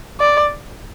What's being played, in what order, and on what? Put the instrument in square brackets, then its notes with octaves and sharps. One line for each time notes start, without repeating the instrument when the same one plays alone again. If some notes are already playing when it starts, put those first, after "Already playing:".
[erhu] D5